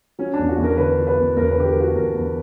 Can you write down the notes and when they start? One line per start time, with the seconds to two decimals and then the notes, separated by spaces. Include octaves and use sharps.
0.19 F#3 C#4
0.34 D4
0.39 E2
0.49 F#4
0.58 E2
0.63 A#4
0.78 D3 B4
0.98 F#3
1.07 B4
1.17 E2
1.37 E2 A#4
1.51 B4
1.57 D3 G4
1.66 A#4
1.76 F#3 F#4
1.96 E2 A#4
2.15 E2